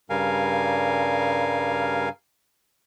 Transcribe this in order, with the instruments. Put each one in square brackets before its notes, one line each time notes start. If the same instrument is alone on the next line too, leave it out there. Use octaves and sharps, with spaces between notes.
[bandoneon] G2 C#3 G3 A#4 F5 G#5